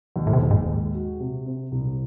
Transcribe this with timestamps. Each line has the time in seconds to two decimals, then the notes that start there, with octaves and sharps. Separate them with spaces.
0.16 D#2
0.27 A2
0.33 C3
0.42 D#2
0.51 G#2
0.67 G#3
0.94 F#4
1.20 C3
1.46 C4
1.71 C2